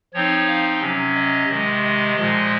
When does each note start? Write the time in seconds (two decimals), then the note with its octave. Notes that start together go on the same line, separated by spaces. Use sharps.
0.14 F3 C4 D#4 C#5
0.47 F5
0.81 C3 F#3 C#4
1.14 D#5
1.48 C3 D#3 G#3
1.83 D#5
2.16 A#2 F3 G#3 D#5